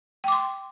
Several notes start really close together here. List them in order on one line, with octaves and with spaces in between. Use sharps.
G5 D6 C6